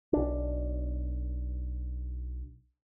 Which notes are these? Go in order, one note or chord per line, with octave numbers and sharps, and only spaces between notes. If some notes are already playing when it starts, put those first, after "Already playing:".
B1 D4